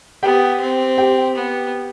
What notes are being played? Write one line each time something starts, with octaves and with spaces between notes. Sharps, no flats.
B3 G4 G5
C4
G4 G5
B3